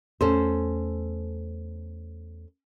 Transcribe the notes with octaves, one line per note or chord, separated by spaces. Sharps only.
E2 A3 C#4 A4 C5